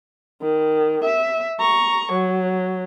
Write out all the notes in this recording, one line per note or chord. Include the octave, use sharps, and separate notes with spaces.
D#3
E5
A#5 C#6
F#3